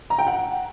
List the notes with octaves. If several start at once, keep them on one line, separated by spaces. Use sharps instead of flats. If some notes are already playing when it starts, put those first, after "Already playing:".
A#5
G5
F#5